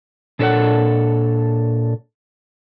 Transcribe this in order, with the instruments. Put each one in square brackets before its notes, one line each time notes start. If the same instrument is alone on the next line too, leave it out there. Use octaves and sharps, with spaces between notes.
[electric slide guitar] A#2 D4 A4 B4 C#5 F#5